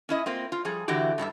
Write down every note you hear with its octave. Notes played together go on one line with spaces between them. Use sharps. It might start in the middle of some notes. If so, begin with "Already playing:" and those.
C#4 E4 D#5
A#3 C4 F4
F4
F3 G3 G#4
D3 E3 E4 F#4 G4
G2 G3 F#4 E5